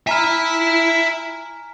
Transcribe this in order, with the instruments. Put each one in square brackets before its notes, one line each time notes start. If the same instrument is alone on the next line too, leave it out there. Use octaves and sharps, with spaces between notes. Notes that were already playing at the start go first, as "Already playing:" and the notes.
[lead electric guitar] E5 B5 [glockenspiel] G#5 A#5 F6